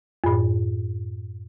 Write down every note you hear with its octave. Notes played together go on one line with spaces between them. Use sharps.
F#2 A2